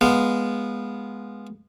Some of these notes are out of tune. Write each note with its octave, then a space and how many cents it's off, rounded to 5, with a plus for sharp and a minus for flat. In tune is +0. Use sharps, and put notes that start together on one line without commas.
G#3 +0 B3 -15 F5 +0